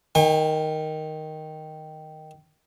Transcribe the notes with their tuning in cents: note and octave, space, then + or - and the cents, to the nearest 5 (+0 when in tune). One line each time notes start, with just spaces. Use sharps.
D#3 +0 G5 +45